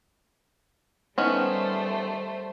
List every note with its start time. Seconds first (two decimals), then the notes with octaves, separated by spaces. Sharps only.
1.18 D#3 G3 A3 B3 C#4 C5